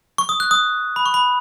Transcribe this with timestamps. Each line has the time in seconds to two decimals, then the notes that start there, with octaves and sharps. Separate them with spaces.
0.18 C#6
0.29 D#6
0.40 F#6
0.51 D#6
0.96 B5
1.06 C#6
1.14 B5